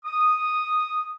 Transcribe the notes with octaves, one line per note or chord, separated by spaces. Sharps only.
D#6